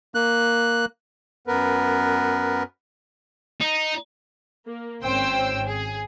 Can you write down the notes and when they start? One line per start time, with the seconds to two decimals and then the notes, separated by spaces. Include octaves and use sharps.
0.15 A#3 F#6
1.47 F#2 B3 A#4 B4
3.60 D#4
4.67 A#3
5.04 G#1 C4 C#4 C5 G5 E6
5.65 G#4